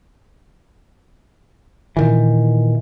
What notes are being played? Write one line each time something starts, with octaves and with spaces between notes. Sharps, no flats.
A#2 D#3 E3